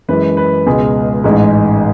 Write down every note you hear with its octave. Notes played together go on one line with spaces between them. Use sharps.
F#2 E3 G#3 B4
B4
C#2 B2 G#3 G#4
A1 G#2 G#3